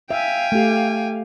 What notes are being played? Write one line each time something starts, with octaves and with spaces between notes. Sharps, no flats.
E5 F5 G5 G#5
A3 G4